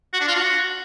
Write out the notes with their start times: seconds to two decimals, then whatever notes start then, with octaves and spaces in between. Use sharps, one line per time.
0.13 F#4
0.20 D4
0.28 F4
0.35 F#4